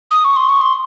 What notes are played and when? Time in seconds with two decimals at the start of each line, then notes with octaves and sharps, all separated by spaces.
0.11 D#6
0.24 C#6
0.36 C6
0.49 C#6
0.61 C6